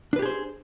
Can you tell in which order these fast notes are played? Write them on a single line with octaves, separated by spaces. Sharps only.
D4 B4 G4 G#4 C5